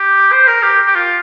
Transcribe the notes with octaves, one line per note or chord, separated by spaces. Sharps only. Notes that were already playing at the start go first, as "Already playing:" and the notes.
Already playing: G4
C5
A#4
G4
G4
F4